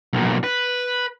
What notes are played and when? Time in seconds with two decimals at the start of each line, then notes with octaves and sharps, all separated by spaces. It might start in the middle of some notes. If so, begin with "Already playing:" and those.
0.13 B1 A#2
0.44 B4